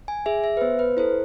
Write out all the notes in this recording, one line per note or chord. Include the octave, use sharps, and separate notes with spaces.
G#5
G#4 E5
E5
B4
B3 C5
B4
E4 A4 C5